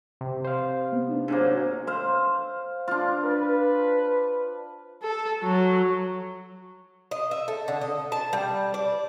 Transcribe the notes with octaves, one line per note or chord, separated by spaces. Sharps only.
C3
C5 F5
B3
D4 D#4
G#2 F#3 A#3
C5 F5
D4 F4
B4
A4
F#3
D#5
E5
A4
D3
D#5
A5
G3
D5